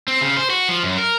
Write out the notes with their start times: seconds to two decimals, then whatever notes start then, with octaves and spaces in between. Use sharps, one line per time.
0.08 C4
0.21 C#3
0.37 C5
0.50 F#4
0.69 F3
0.83 F#2
0.98 A#4